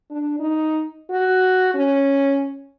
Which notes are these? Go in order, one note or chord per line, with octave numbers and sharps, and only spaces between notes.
D4
D#4
F#4
C#4